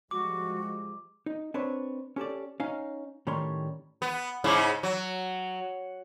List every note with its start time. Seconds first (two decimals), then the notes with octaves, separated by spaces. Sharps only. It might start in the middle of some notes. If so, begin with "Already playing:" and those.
0.11 F3 G3 G#3 F#4 D6
1.26 D#4
1.54 C4 D4 B4 C#5
2.16 C#4 G4 A4 D5
2.60 C#4 D#4 F5
3.27 A2 D#3 G3 C#4 C#5 C6
4.02 B3
4.44 G#2 C#3 E4
4.83 F#3